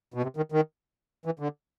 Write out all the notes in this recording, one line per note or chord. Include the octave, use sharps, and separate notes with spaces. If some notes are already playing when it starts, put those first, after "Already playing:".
B2
C3
D#3
D#3
E3
D3